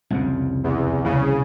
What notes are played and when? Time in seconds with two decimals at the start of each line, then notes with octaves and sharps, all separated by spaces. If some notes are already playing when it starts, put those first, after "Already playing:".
0.11 C2 F2 C#3
0.64 E2
1.05 C2 C#3 E3